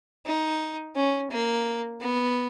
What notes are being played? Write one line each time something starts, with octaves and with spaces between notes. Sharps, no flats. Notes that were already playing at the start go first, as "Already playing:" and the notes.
D#4
C#4
A#3
B3